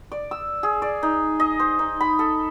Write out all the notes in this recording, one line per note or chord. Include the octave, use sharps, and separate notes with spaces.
D5
E6
G#4
D5
D#4
D#5
C5
D#4
B5
A4